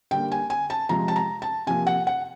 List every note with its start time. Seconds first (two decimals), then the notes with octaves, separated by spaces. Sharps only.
0.11 D3 G3 A#3 G5
0.32 G#5
0.50 G#5
0.70 A5
0.89 C3 F3 G#3 A#5
1.08 A5
1.16 A#5
1.42 A5
1.67 C3 F3 A#3 G#5
1.87 F#5
2.07 F#5